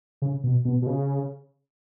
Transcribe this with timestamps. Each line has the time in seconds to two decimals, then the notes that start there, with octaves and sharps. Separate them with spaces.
0.22 C#3
0.44 B2
0.65 B2
0.82 B2
0.87 C#3